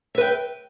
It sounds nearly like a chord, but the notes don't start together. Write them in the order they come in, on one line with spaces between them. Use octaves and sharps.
E5 B4 G5